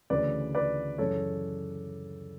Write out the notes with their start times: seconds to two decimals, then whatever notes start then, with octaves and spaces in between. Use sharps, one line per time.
0.10 D2 C#3 E3 B4 D5
0.55 B4 D5
0.98 F#2 C#3 E3 A4 C#5